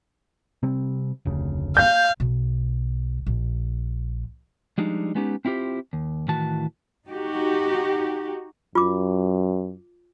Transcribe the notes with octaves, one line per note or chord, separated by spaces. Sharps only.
C3 G3 C4
F1 D2 C#3
F5 G6
B1
A#1
F3 G3 G#3 D4 D#4
G#3 B3 C#4 D#4 G4
C4 E4 F4 G4 C5
D#2
A2 D#3 E3 F#4 A5
D#4 F#4 G4
F#2 F4 D6